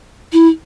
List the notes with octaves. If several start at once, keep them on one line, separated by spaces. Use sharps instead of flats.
E4